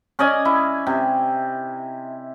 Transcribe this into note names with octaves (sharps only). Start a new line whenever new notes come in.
C#4 D5 D#5 G#5
E4
C3